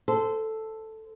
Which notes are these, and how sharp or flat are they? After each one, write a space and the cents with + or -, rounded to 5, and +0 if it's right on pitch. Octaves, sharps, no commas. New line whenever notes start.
A4 +0 C5 -20